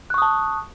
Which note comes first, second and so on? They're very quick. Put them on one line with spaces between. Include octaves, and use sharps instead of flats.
F#6 C#6 D#6 A5